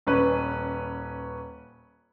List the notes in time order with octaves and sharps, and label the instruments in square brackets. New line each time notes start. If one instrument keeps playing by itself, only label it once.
[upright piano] D#1 C#4 B4